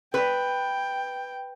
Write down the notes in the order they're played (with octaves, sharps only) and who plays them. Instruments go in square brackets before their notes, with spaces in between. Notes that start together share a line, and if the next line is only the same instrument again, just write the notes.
[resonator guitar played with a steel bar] B4 [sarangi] G5